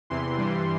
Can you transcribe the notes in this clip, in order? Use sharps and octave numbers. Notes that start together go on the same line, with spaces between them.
E2 C3 E3 C6
G2 E3 G3